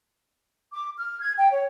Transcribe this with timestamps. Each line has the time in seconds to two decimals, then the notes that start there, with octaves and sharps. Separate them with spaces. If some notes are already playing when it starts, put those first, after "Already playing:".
0.73 D6
0.98 F6
1.20 G#6
1.37 G5
1.51 C#5